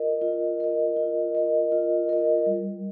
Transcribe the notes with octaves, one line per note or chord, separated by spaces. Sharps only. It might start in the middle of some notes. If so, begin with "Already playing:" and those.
Already playing: F4 A#4 D#5
F4
A#4 D#5
F4
A#4 D#5
F4
A#4 D#5
G3